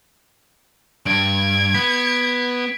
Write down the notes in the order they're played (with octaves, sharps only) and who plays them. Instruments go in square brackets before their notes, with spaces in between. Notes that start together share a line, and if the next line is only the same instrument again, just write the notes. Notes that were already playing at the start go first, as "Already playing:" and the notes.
[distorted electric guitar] G2 [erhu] G#6 [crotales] D7
[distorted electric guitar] B3 [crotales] B6